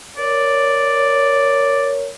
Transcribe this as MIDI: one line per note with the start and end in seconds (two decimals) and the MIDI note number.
0.17 2.08 70
0.17 2.08 73
0.17 1.89 74